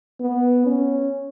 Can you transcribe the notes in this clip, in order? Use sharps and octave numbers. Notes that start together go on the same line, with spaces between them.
B3
C#4